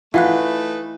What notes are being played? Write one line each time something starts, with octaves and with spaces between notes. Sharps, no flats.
E3 A3 D#4 F4 B4 F5 F#5 F#6